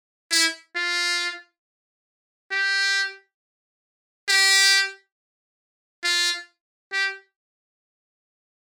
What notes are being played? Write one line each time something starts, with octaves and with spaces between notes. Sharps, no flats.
E4
F4
G4
G4
F4
G4